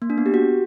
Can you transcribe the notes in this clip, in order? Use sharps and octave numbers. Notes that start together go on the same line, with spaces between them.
A#3
D4
B3
G4
F#4